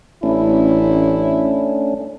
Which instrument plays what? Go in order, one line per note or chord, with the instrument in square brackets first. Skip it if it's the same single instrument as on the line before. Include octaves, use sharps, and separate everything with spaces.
[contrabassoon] A1 [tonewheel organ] A3 C#4 D4 [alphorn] E4